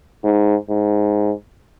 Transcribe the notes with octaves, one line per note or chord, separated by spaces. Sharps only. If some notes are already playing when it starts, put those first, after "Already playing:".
G#2
G#2